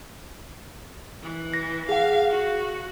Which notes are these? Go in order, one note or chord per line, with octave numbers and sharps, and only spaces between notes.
E3
A#6
G#4 F5 F#5
F#4